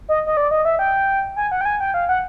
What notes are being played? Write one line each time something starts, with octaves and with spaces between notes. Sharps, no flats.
D#5
D#5
D5
D#5
E5
G5
G#5
F#5
G5
G#5
G5
F5
F#5